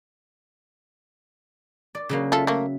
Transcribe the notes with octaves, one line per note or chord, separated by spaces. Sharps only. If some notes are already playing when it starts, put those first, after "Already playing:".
D5
C#3 F#3 A#3
F4 A4 E5
A3 A#3